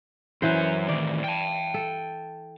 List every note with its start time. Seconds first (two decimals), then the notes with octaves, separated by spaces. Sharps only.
0.42 F#2 E3 C#4 C5
0.89 A2 D#3 D5
1.24 G5 A5
1.74 A4